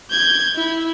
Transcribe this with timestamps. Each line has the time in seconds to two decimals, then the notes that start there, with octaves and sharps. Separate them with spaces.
0.10 G6 G#6
0.56 E4